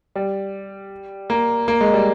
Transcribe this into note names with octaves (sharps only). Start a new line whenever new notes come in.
G3
A#3
A#3
G#3
G3